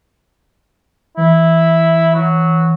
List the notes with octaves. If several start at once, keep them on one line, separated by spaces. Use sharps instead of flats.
E3 E4
F#3